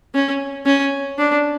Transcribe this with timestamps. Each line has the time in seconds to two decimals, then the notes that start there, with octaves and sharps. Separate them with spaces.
0.15 C#4
0.66 C#4
1.18 D4